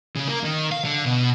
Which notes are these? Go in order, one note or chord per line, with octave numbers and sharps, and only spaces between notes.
C#3
A#3
D#3
F5
D3
B2